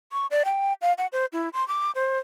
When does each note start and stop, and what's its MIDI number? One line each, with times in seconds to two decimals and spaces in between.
0.12 0.26 85
0.31 0.43 74
0.45 0.73 79
0.82 0.93 77
0.98 1.07 78
1.12 1.26 72
1.33 1.49 64
1.54 1.67 84
1.68 1.91 86
1.95 2.18 72